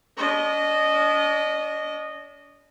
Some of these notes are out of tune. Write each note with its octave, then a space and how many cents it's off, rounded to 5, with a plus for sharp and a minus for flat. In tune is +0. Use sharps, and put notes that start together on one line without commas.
D4 -45 D#5 -15